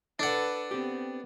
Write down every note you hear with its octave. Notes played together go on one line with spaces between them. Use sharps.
D4 A4 B4 F#5
B3 C4 G4